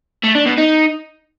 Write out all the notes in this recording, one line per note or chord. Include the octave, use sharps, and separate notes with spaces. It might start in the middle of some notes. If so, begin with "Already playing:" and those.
A3
D4
B2
D#4